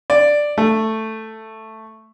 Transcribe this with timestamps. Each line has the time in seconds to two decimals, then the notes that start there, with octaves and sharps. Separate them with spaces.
0.10 D5
0.58 A3